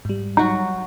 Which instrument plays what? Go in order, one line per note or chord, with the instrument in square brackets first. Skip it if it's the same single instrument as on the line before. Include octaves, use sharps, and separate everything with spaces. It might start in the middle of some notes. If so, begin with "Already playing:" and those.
[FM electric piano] G#2 G3
[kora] F#3 F#4 [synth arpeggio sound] D#4